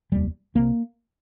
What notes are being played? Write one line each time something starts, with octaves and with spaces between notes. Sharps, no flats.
F1 D#2 G3
C2 C3 A#3